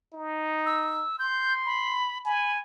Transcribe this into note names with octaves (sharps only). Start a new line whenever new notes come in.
D#4
E6
C6 G6
B5
G#5 B5